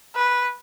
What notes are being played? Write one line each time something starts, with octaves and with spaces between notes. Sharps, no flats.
B4